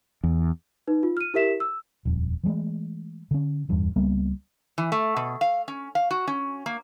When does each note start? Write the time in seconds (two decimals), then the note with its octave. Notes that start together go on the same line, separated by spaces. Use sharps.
0.24 E2
0.87 D#4 B4
1.03 F4
1.17 F6 D#7
1.34 E4 G4 A#4 E5 B6 E7
1.60 E6
2.05 D#1 F2
2.43 E3 F#3 G#3 A3
3.31 D3 C#4
3.69 D1 E2 G2
3.96 C#2 G3 A#3 B3
4.78 E3
4.92 A3
5.16 B2
5.41 F5
5.68 C#4
5.95 F5
6.11 F#4
6.28 C#4
6.66 A#3